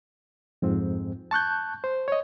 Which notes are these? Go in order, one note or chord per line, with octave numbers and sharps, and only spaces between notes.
F2 G#2 C4
A5 C#6 F#6 G6
C5
C#5 D#5